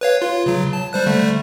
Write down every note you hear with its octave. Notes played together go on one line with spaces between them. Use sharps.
B4 C#5 F5
F4
C#3 F#3
A5
G3 C5 F#6
D3 G3 A3